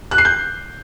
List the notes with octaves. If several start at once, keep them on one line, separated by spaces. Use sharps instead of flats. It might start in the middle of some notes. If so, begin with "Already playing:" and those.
F#6
C7
G6